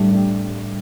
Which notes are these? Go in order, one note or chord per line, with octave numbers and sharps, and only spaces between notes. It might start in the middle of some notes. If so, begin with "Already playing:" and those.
Already playing: A2 G3 A3 D4 G4
A2 A3 D4 G4